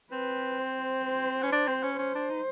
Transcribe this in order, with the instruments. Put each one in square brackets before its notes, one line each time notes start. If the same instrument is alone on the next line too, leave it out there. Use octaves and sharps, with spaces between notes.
[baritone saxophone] C4 [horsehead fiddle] B4
[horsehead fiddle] C5
C5
[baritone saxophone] C#4
D4
C4
C#4
[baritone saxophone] C#4 [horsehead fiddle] C5
[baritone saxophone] D4
D#4